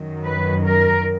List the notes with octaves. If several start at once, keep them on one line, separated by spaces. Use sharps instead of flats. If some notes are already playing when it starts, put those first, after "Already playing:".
Already playing: F#2 D#3 F#3
B4
A#4